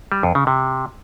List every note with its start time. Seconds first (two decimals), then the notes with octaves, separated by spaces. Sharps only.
0.12 G3
0.23 F2
0.35 C#3
0.47 C3